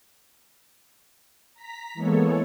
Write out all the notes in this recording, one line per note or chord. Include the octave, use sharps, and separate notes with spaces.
A#5 B6
E3 G#3 A#3 B3 A4 C#5